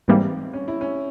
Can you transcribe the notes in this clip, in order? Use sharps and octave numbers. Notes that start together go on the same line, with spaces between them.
G#2 E3 G3 A#3 C4
C#4
E4
C#4